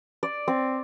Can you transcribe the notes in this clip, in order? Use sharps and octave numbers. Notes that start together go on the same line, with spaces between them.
D5
C4